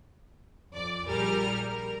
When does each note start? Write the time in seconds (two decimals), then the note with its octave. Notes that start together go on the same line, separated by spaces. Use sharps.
0.73 F2 D5
1.06 A#1 G3 G4 G#4 A#4 F6
1.68 A#4